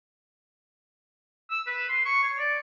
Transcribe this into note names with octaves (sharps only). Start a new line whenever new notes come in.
E6
B4
C6
C#6
C#5
D5